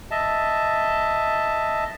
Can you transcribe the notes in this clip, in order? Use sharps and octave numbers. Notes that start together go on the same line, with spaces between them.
D#5 E5 A5